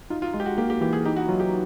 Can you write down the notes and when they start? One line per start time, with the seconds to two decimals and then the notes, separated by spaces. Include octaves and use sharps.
0.10 D#4 F4
0.22 F4
0.33 G#3 F4
0.40 G4
0.46 F#4
0.58 A#3 G4
0.70 G4
0.81 E3 G4
0.93 G#4
1.05 D#4 G4
1.16 F#4
1.29 F#3 F4
1.40 G4